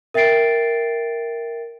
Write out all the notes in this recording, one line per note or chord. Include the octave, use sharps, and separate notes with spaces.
A#4 E5 G5 A6 C7 D7